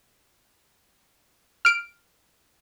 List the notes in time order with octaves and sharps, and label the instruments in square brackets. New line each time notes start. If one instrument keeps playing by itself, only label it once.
[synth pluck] F6 D7